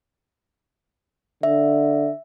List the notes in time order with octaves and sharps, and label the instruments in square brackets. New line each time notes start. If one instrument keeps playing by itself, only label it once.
[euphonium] D3 [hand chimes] E5